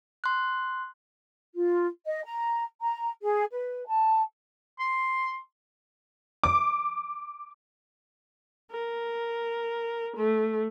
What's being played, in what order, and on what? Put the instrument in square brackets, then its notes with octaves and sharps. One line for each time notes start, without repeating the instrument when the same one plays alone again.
[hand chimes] C6 F#6
[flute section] F4
D#5
A#5
A#5
G#4
B4
A5
[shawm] C6
[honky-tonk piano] D6
[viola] A#4
A3